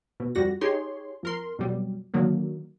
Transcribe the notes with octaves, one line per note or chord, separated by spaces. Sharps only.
B2
F2 G3 F#4 A#6
D#4 G4 G#4 C#5 C6
F2 A#4 C6
F2 B2 F#3 G3
D3 D#3 F#3 A#3